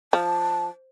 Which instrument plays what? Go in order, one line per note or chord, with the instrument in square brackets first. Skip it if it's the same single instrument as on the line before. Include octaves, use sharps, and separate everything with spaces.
[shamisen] F3 [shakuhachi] A5